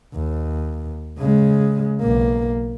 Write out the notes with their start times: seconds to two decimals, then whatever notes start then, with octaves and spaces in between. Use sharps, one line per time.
0.14 D#2
1.18 C#3 G#3
2.01 B1 A#3